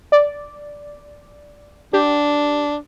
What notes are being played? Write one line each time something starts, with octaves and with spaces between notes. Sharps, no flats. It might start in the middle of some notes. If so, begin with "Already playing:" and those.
D5
D4 G4